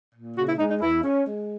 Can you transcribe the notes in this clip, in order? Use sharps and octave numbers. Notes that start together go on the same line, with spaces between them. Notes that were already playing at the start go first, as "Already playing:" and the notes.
A#2
C#3 F#4
E4
G#3 D#4
D#4
E2 E4
C#4
G#3